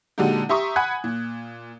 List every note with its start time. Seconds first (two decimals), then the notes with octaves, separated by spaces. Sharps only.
0.18 A#2 D3 G#3 D#4 F#4 G4
0.49 G4 E5 A#5 C6 C#6 D#6
0.76 F#5 G#5 B5 F#6 G#6
1.04 A#2